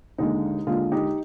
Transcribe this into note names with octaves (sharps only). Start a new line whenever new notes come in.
D#2 D3 G#3 D#4
D#2 D3 G#3 F4
D#4 G4